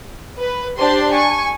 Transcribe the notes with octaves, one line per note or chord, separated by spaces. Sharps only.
B4
D4 G4 C5 C6
G#5 C#6